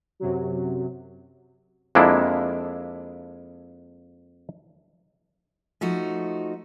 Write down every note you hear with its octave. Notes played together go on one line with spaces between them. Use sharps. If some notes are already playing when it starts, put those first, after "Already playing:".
F#2 C3 F#3
F2 G#3 A#3 D4 E4
F3 A3 D#4 F#4